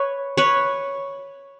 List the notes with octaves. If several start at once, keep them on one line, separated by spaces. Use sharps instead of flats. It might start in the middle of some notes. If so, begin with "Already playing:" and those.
Already playing: B4 C#5
B4 C#5